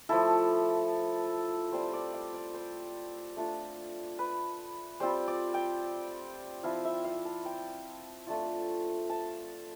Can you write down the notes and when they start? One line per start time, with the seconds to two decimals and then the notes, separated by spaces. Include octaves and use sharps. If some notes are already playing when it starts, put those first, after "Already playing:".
0.09 F3 A3 E4 A4
1.72 G3 C4 F4 C5
1.93 D5
2.13 F5
2.34 D5
2.54 C5
3.36 A3 D4 F4
4.19 B4
5.00 G3 C4 F4 C5
5.28 D5
5.54 G5
6.63 F3 C4 E4 F5
6.85 E5
7.04 F5
7.25 A5
7.45 G5
8.27 A3 D4 F4
9.10 A5